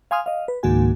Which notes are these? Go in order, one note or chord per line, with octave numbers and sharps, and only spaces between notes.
F5 G#5 C6 D#6 F6
D#5 F5
B4
C#2 G#2 D#3 A#3 F#4 G#5